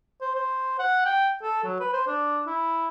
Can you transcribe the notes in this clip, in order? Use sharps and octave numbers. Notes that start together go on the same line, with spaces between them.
C5
C5
F#5
G5
A4
F#3
B4
C5
D4
E4